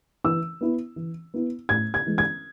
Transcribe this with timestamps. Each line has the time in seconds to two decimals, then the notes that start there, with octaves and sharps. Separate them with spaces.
0.25 E3 E6
0.61 B3 E4
0.96 E3
1.34 B3 E4
1.69 A2 G#6
1.94 G#6
2.07 E3 G#3
2.18 G#6